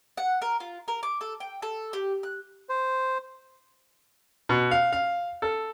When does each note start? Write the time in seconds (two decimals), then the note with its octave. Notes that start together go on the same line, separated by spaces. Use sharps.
0.17 F#5
0.42 A#4
0.60 F4
0.88 A#4
1.03 D6
1.21 A4
1.40 G5
1.62 A4
1.93 G4
2.23 F#6
2.69 C5
4.49 B2
4.71 F5
4.92 F5
5.42 A4